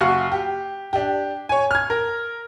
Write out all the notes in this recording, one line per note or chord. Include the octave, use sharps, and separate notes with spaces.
F#1 F#4 F5 C#6
G4
D4 G4
C#5 G#5
F6 G#6
A#4